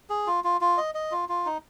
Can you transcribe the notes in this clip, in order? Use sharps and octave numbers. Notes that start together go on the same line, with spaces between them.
G#4
F4
F4
F4
D#5
D#5
F4
F4
D#4